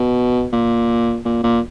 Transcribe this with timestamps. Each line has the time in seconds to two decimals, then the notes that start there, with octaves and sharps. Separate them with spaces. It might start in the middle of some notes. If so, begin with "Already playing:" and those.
Already playing: B2
0.52 A#2
1.25 A#2
1.43 A#2